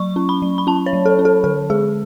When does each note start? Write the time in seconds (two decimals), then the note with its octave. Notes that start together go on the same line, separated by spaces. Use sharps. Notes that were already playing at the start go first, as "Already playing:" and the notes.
Already playing: F#3 C#6
0.16 C#4
0.29 B5
0.42 F#3
0.58 B5
0.67 C#4 A5
0.86 C#5
0.93 F#3
1.06 A4
1.19 C#4
1.25 A4
1.44 D3 A4
1.70 G#3 G#4